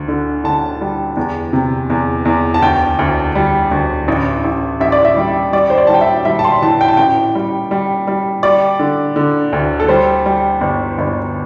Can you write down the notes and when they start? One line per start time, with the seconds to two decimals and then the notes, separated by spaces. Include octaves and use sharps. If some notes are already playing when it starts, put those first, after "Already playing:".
Already playing: D2
0.08 D3
0.44 D3 A5
0.81 G3
1.17 E2
1.53 C3
1.90 E2
2.25 E2
2.54 A5
2.62 D2 G5
2.99 D2
3.35 G3
3.71 D2
4.08 A1
4.45 A1
4.81 A1 E5
4.92 D5
5.05 E5
5.17 G3
5.52 G3 D5
5.70 C5
5.78 D5
5.87 G3 A5
5.94 G5
6.01 E5
6.25 G3 E5
6.39 A5
6.44 C6
6.62 E3 A5
6.81 G5
6.88 A5
6.97 A1 G5
7.35 G3
7.71 G3
8.07 G3
8.43 G3 D5
8.79 D3
9.16 D3
9.53 D2
9.80 A4
9.88 G3 C5
10.26 G3
10.61 G1
10.98 G1